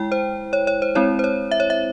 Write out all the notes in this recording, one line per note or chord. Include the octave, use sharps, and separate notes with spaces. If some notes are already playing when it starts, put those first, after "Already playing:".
Already playing: G#3 E4 G5
C5
C#5
C#5
C5
G#3 C4 E4 C#5
C5
C#5
E5
C#5
E5